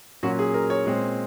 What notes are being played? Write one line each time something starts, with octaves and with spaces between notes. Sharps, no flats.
A#2 F#3 C#4 F#4
G#4
A#4
C#5
A#2 G#3 C4